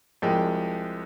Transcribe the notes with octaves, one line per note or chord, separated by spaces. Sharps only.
C2 F3 G#3 G5